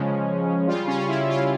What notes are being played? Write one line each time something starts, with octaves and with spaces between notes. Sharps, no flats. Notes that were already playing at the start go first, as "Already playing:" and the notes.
Already playing: C#3 F3 G#3 C#4
C#3 G3 F4
C#4
C#4
E4
F4